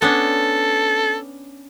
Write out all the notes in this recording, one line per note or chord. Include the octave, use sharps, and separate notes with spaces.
B3 C#4 D4 A4